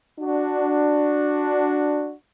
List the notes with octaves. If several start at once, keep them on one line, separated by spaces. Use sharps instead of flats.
D4 F#4